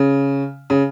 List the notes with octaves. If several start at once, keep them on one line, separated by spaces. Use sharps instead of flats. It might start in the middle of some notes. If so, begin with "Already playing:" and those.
Already playing: C#3
C#3